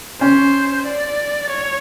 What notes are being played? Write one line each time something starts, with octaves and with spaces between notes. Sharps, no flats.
C#4 C5
D5
C#5